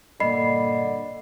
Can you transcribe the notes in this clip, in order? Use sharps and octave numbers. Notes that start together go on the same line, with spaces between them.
G2 A#2 D3 A#3 D#5 B5 C7